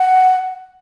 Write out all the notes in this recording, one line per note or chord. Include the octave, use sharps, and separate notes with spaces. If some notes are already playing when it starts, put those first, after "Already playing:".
Already playing: F#5